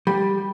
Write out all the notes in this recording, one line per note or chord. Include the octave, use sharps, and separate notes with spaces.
G3